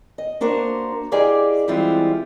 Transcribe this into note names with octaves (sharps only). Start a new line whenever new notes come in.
D#5
A#3 D4 F#4 A#4 C5
E4 G4 G#4 D5 D#5 F5
E3 G3 G#3 C4 E4 F4